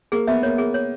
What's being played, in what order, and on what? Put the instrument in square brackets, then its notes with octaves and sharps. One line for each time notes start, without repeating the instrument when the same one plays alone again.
[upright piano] A#3 [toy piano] G#4
[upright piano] B3 [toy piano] E5
[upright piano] A#3 [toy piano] C#5
[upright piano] A#3 [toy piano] G#4
[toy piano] C#5